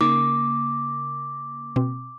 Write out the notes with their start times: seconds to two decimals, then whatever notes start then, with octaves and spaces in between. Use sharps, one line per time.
0.01 C#3 A#3 D#4 D6
1.76 B2 C4